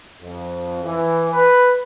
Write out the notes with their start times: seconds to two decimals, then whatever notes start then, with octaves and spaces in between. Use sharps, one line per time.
0.23 F2
0.84 E3
1.32 B4